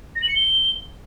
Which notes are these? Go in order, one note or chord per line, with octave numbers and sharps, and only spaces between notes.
A#6
F#7
C#7
G7